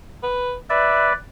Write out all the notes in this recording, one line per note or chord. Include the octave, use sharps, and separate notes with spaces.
B4
B4 D5 E5